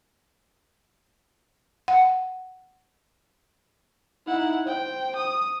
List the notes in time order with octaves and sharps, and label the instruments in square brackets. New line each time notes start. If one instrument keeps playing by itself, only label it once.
[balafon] F#5
[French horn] D#4 [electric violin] E4 F#5
[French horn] C5 [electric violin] G5
[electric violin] D#6